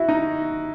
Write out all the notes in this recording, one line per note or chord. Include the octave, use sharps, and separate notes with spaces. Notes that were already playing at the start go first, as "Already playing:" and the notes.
Already playing: E4 F#4
D#4